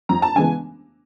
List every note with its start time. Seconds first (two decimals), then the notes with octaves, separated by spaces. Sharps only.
0.09 F2 A#5
0.22 A5
0.35 C#3 E3 G#3 B3 G#5